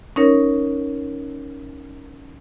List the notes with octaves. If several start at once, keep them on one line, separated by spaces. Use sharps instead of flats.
C#4 D#4 A#4 C#5